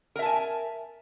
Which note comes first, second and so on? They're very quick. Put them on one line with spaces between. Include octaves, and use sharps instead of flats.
A#4 E5 A5 G#5